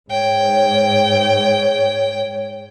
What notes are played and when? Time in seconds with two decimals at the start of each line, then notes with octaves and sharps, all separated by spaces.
0.11 G#2 C#5 G5